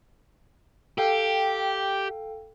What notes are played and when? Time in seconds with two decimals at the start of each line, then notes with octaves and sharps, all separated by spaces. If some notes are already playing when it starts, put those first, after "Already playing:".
0.98 G4 A4 F5 G5